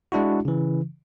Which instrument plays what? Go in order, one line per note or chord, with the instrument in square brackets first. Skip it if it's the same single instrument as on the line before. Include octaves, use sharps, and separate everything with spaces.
[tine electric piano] G#3 D4 E4 F#4
C#3 E3